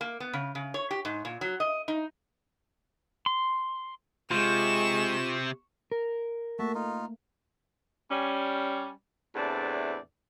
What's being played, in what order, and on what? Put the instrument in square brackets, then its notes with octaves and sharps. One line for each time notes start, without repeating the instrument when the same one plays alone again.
[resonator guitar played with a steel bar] A#3
B3
C#3
C#3
C#5
G4
G#2
A#2
F#3
D#5
D#4
[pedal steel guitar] C6
[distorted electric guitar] C3 [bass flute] G#3 [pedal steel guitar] F4 [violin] C#6 E7
[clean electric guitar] A#4
[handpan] A3 A#3 [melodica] F#4 E5 A5
[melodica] D#4 F4
[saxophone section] G3 C#4
E2 A2 C3 D4 D5